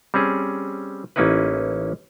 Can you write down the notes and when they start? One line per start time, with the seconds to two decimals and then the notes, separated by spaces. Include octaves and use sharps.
0.14 G3 C4 C#4 G#4
1.16 A1 A#3 C#4 D#4 E4 B4